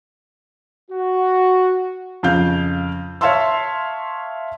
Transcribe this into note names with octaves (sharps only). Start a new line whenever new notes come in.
F#4
F2 C#3 F5 G6
C#5 E5 F5 A5 C6 E6